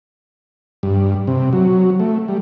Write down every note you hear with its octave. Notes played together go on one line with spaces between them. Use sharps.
G2
C3
F#3
A3
G3